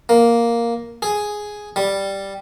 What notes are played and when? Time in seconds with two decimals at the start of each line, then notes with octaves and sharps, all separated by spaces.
0.09 A#3
1.02 G#4
1.76 G3